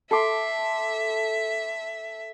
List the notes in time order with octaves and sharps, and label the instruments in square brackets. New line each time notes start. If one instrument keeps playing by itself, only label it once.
[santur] A4 C6 D6 [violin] E5